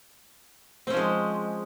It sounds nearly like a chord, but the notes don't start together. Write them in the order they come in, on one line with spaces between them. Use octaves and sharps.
C4 C#4 F3 G#3